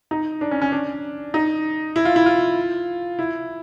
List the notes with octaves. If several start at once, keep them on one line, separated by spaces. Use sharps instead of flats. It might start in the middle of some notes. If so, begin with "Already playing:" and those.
D#4
D4
C#4
C#4
D4
D#4
E4
F4
E4
F4
E4